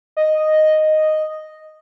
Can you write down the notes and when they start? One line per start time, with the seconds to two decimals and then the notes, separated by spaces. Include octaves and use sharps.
0.17 D#5